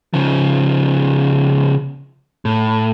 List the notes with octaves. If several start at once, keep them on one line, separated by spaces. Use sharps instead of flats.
C#3 F3
A2